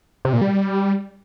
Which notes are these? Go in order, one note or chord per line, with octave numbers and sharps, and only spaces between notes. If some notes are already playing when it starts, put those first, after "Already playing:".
C3
A#2
G3